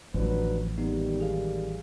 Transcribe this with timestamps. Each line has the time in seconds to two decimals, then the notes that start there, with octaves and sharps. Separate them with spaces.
0.14 A1 D#3 F3 F#3 D4 B4
0.78 G#1 D#3 G3 B3 D#4
1.20 G#4 F5